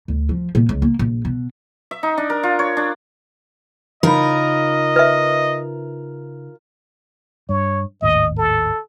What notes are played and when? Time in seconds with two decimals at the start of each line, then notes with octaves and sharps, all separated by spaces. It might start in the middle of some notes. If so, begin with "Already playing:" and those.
0.08 D2
0.29 F3
0.55 A#2
0.69 C#2
0.82 A#3
0.99 A#1
1.25 B2
1.91 E5
2.03 D#4
2.18 D4
2.30 A#4
2.43 F4
2.59 C#5
2.77 D4
4.03 C#3 D#4 F4 A#4 D#5 B5
4.96 B4 E5
7.49 G2 C#5
8.02 G#1 D#2 A2 D#5
8.38 A4